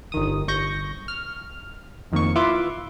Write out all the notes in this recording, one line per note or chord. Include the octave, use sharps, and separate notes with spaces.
G1 D#3 D#6
G1 C#6 G6 A#6
F6
F2 D#3 A#3 C#6
E4 F4 B4 E5 C6 D6